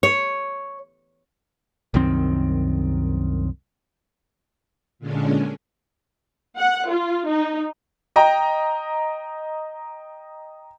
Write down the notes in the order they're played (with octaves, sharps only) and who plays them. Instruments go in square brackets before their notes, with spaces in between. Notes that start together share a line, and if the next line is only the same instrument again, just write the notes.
[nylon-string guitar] C#5
[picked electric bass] C2 F#2 D#3 C4
[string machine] A#2 D3 G#3 C#4 D4
[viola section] F#5
F4
D#4
[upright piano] D#5 G5 A#5